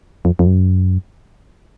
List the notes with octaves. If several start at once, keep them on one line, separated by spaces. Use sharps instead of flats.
F2
F2
F#2